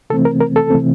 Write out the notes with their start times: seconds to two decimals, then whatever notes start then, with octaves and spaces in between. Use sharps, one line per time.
0.10 C3 E3 A3 C4 A4
0.25 A#4
0.41 A#4
0.56 A4
0.70 C3 E3 A3 C4